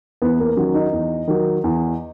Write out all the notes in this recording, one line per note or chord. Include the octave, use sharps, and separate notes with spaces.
E2 B3
A#3
D#3 F#3 C#4
D#4
E2
D#3 F#3
E2